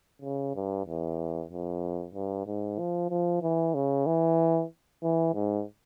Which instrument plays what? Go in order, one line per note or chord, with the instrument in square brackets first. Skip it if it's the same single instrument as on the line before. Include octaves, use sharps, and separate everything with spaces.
[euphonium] C#3
G2
E2
F2
G2
G#2
F3
F3
E3
C#3
E3
E3
G#2